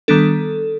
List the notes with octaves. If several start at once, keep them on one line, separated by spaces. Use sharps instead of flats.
D#3 G3 B3 D4 A4